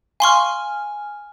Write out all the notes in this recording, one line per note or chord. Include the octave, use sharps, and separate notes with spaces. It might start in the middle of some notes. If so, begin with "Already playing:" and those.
F5 G#5 C6 C#6 F6